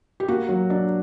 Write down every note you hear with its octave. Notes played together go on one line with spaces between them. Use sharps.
G4
A#3 F#4
F#3
D4